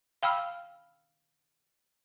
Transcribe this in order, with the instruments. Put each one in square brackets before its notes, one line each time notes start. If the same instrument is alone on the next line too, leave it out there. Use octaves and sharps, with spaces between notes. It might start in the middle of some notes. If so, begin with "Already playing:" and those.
[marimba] F5 G5 B5 E6 F6